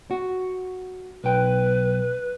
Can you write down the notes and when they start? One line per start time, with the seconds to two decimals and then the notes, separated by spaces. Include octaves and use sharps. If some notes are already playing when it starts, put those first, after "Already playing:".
0.11 F#4
1.24 B1 B4 G5